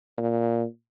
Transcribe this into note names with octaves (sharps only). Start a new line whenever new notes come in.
A#2